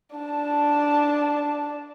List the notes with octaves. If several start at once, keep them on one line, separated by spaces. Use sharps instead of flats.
D4 A5